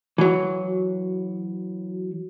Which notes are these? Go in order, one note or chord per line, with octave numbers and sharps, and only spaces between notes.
E3 F#3